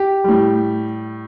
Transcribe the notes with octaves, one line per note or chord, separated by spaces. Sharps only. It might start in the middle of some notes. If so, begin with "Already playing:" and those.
Already playing: G4
A2 G3